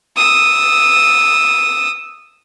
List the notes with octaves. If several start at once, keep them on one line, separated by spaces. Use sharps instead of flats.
D#6 E6